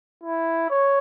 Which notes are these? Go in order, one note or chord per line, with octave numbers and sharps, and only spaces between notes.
E4
C#5